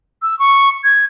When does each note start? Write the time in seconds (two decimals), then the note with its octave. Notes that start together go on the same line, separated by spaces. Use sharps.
0.22 E6
0.39 C#6
0.84 G#6